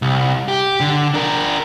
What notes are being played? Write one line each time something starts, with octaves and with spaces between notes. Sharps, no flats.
C2
G4
D3
D4 A#4